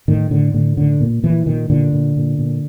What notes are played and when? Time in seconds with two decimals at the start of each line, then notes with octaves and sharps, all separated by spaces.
0.08 A2 D#3
0.31 A2 D3
0.54 A2 D3
0.77 A2 D3
1.01 A#2
1.23 A#2 E3
1.46 A#2 D#3
1.70 A#2 D3
1.93 A#2
2.16 A#2
2.39 A#2